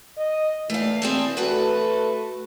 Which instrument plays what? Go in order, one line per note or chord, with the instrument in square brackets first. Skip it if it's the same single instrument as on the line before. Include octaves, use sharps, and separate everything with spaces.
[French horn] D#5
[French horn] E3 [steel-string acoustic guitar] A3 F5
[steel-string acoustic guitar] C4 G#4 A4
[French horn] A3 [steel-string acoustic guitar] F#4 A4 B4